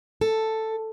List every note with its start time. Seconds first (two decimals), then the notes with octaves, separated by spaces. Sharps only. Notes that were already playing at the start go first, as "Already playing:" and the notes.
0.21 A4